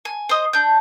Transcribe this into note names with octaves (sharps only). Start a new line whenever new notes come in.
G#5
C5 D#5
D4 G6